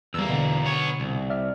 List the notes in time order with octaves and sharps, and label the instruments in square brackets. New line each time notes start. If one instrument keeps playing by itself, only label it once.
[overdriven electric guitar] E2 A#3 [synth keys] G3 E6
[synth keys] B2 D3
[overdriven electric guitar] B3 C#5
C2
[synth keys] D5 E5 F6